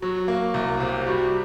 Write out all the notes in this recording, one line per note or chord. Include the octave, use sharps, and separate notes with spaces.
F#3 F#4
A#3
C2
C3
G3 F#4